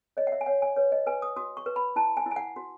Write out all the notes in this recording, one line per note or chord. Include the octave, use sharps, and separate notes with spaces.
C#5 D#5
F#5
E5
G#5
C#5 F#5
G#5
B4 C#5
D#5
B4 G#5
D#6
F#4 D#6
C#6
B4
B5
E4 A5
G#5
E4
G#5
F#5
F#4